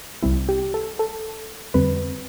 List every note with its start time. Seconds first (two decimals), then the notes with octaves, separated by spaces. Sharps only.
0.23 C2 C3 G3 C4 E4
0.49 G4
0.74 A4
0.99 A4
1.74 F2 D3 G3 C4 B4